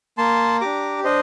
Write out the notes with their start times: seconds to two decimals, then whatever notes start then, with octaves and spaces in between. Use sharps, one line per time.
0.18 A#3 A5 C6
0.61 D4 G4 A#5 D6
1.04 D4 C5 D#5